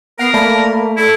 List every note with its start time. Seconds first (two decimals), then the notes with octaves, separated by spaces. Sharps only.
0.19 B3 A#4 F#5 C7
0.34 A3 A#3 D5 A5 B5
0.97 E4 A4